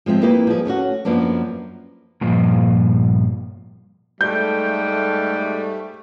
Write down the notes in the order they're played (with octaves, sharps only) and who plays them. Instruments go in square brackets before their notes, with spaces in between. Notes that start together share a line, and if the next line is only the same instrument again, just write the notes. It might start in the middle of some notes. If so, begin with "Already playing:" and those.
[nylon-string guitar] F3 G#3 C4 E5
F2 A#3 E4 G4 B4 D#5
F3 G3 G#4
A3 C#4 E4 F#4
F#2 F3 A#3 B3 D4
[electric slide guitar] G2 A#2 F3
[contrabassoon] G#2 [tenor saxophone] G3 [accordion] A3 [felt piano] G6